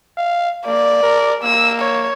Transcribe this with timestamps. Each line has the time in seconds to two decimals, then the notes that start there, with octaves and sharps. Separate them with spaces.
0.18 F5
0.66 A#3 D5
1.03 A#4
1.43 A#3 E6
1.80 C#5